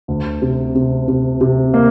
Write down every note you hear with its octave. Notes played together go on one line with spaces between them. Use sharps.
D2
C3
C3
C3
C3
A#3